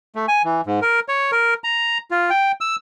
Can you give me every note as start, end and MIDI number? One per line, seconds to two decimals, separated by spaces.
0.16 0.26 57
0.28 0.42 80
0.44 0.61 52
0.66 0.80 44
0.82 1.00 70
1.08 1.31 73
1.32 1.54 70
1.64 1.98 82
2.11 2.30 65
2.30 2.52 79
2.61 2.76 88